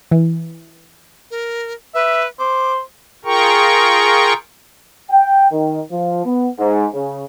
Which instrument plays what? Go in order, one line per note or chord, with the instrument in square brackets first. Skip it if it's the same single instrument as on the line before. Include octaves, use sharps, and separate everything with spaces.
[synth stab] E3
[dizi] A#4
[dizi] B4 [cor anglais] E5
[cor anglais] C5 [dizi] D6
[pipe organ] F4 G#4 A#4 G5 A#5 C#6
[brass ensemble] G5
D#3
F3
B3
G#2
C#3